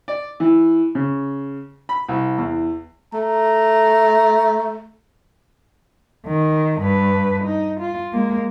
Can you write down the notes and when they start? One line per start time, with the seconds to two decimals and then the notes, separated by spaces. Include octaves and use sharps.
0.08 D5
0.40 E3
0.95 C#3
1.89 B5
2.08 C2
2.38 E2
3.13 A3 A#5
6.27 D#3
6.81 G2 B4
7.44 D#4
7.80 F4
8.13 G#3 A#3